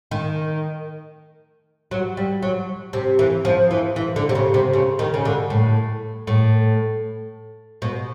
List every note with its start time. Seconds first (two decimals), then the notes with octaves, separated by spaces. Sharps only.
0.11 D#3
1.91 F#3
2.17 G3
2.43 F#3
2.93 C3
3.19 E3
3.45 F3
3.71 E3
3.96 E3
4.16 D3
4.29 C3
4.35 C#3
4.54 C3
4.73 C#3
4.99 D#3
5.14 C#3
5.25 D3
5.50 A2
6.27 A2
7.82 B2